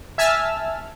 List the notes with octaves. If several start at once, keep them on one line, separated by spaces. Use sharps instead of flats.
E5 G#5 A5 E6 F6